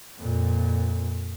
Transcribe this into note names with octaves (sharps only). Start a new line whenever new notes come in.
F2 A#2